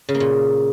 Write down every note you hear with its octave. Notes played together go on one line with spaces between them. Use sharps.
C#3
A#3
A#2